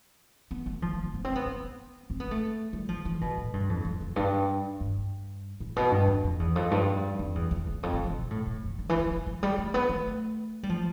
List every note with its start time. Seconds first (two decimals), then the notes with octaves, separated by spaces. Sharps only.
0.51 B3
0.66 A3
0.82 F3
0.93 F3
1.04 B3
1.14 B3
1.25 C4
1.36 B3
1.46 B3
2.10 C4
2.20 B3
2.31 A3
2.73 G3
2.89 F3
3.05 E3
3.21 B2
3.37 A2
3.54 G2
3.69 F2
3.85 F2
4.01 F2
4.16 G2
4.81 G2
5.60 A2
5.76 B2
5.91 G2
6.07 F2
6.24 F2
6.39 E2
6.56 F2
6.71 G2
7.19 F2
7.35 E2
7.51 E2
7.67 E2
7.83 F2
7.93 D3
8.04 F3
8.15 B2
8.31 A2
8.47 A2
8.63 F2
8.78 D3
8.89 E3
9.00 F3
9.11 F3
9.26 F3
9.43 G3
9.58 A3
9.74 B3
9.89 A3
10.63 G3
10.69 F3